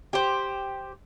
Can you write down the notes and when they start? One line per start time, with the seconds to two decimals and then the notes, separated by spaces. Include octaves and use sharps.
0.13 G4 C5